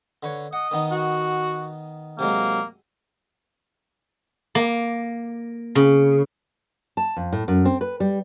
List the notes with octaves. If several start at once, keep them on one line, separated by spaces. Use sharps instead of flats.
D3 B4 C#5
D#5 F#5
D#3 B3 D#4
F#4
C3 F#3 G#3 A#3
A#3
C#3
A5
F2
A2
F#2
C4
B4
G3